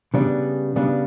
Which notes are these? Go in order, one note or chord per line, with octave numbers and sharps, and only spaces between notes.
C#3 G3 B3 D4
C#3 G3 B3 D4